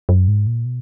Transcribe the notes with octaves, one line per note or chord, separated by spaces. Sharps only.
F#2
G#2
A#2
B2